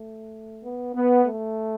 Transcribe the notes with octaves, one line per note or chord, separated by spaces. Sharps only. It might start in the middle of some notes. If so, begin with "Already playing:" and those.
Already playing: A3
B3
B3
A3